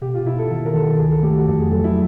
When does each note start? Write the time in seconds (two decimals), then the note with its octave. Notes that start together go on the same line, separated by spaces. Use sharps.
0.01 B2 G4
0.14 F4
0.26 B2 E4
0.38 A4
0.50 D#3 A4
0.66 A#4
0.74 D#3 A4
0.91 A4
0.99 C#2 G#4
1.11 A4
1.23 A3 G4
1.36 F#4
1.47 F2 A4
1.59 G#4
1.71 F#3 A4
1.84 E4